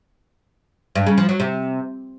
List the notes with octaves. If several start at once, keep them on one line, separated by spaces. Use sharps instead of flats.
G2
C#3
F3
F#3
C3